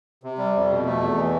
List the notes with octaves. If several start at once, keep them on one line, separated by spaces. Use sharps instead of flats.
C3
G3
F2
B2
A3
E2
E3